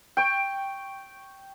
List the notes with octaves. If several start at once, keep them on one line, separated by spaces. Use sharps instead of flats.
G5 C#6